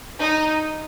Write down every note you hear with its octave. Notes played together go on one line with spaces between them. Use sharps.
D#4